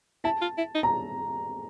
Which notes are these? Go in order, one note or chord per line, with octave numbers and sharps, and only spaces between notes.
E4 A5
F4
E4
D#4
A#5